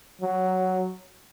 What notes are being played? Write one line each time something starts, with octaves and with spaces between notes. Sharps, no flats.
F#3